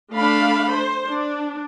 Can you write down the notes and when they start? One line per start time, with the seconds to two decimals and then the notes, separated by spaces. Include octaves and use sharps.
0.14 A3 D4 F5 B5
0.76 C5
1.11 D4